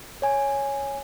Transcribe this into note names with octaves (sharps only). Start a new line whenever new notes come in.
C#5 G#5